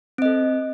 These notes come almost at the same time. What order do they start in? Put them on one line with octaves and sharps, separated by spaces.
C4 D#5 A4